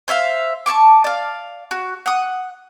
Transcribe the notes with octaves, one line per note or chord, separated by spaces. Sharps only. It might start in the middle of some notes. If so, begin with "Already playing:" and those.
C5 C#5 E5 F5
A5 A#5 C#6 D6
D5 F5
F#4
F#5 D#6